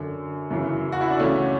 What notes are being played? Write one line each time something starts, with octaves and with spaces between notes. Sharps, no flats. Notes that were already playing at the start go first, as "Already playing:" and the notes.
Already playing: F#2 D3
F#2 C#3 E3
F#4
E4
D4
C#2 C#3 E3 A3 C#4